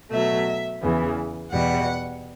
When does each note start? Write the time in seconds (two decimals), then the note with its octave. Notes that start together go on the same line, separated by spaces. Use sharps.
0.12 B2 F#3 A3 E5
0.82 E2 C#3 E3 B3
1.52 E2 B2 G3 F#5